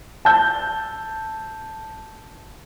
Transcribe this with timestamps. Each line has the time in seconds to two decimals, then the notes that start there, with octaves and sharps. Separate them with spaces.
0.25 A5 E6 G6